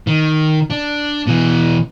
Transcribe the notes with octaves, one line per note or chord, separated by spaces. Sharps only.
D#3
D4
B2 E3